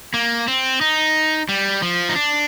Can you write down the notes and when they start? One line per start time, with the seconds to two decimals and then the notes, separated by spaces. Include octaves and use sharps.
0.14 A#3
0.48 C4
0.81 D#4
1.49 G3
1.82 F3
2.09 D#4
2.15 D4